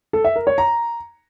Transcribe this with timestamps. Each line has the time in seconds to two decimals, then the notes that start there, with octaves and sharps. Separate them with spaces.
0.13 A4
0.25 E5
0.36 A#4
0.47 C#5
0.58 A#5